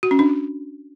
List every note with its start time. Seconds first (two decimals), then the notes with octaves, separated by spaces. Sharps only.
0.03 F#4
0.11 C#4
0.19 D4